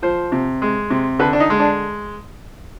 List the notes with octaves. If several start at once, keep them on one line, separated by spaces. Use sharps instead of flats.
F3 C5
C3
G#3
C3
D3 B4
D4
D#4
G#3
D4